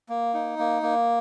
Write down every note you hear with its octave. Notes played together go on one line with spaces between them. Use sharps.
A#3
D#4
A#3
A#3